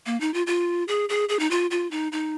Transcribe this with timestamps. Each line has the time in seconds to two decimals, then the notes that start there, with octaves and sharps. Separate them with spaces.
0.06 A#3
0.20 D#4
0.34 F4
0.47 F4
0.88 G#4
1.09 G#4
1.29 G#4
1.39 D#4
1.51 F4
1.71 F4
1.91 D#4
2.12 D#4